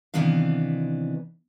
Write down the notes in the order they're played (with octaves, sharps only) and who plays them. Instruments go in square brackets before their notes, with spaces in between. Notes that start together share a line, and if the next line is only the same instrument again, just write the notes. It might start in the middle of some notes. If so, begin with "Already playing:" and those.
[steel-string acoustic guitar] C3 D#3 E3 B3 D4 F5